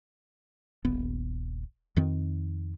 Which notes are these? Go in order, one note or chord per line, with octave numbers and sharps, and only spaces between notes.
D#1 A#1 B3
F2 D#3 C4